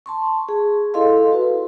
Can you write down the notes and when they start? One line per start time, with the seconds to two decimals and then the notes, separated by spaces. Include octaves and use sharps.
0.06 A5 C6 C#6
0.49 G#4
0.94 E4 A4 D#5 F5 C6
1.32 F#4 B4